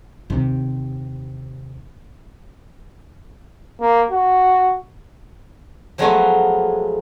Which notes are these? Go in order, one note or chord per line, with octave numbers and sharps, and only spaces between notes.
D#2 C3
A#3
F#4
F3 F#3 G#3 A3 B3 F4